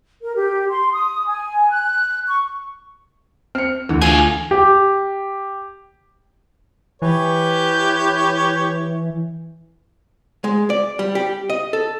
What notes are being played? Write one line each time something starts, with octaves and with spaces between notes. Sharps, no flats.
A#4
G4
C6
D#6
G#5
F#6
C#6
C4 F6 C#7
D2 E3
F4 G#4 G#5 G#6 C7
G4
E3 G4 B4 C#5
G#3
D5
G3
G4
D#5
A4